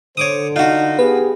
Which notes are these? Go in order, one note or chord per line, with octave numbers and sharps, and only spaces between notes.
D3 C5 C#5 D6 D#6
D#4 F4 F#4
B3 G4 G#4 B4